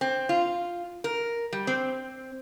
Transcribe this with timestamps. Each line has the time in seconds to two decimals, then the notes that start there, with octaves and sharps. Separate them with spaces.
0.01 C4
0.29 F4
1.04 A#4
1.53 G3
1.67 C4